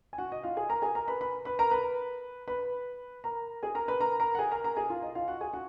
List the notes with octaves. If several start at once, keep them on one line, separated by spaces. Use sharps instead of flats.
G#5
F#4 F#5
D#5
F4 F5
G#4 G#5
A#4 A#5
G#4 G#5
A#4 A#5
B4 B5
B4 B5
B4 B5
A#4 A#5
B4 B5
B4 B5
A#4 A#5
G#4 G#5
A#4 A#5
B4 B5
A#4 A#5
A#4 A#5
F#5
G#4 G#5
A#4 A#5
A#4 A#5
G#4 G#5
F4 F5
D#5
F4 F5
F#4 F#5
G#4 G#5
F#4 F#5